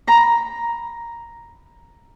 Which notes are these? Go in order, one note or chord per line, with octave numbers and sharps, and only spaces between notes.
A#5 B5